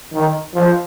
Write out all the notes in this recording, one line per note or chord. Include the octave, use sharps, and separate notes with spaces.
D#3
F3